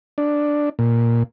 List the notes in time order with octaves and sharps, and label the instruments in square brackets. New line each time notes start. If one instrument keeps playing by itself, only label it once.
[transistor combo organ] D4
A#2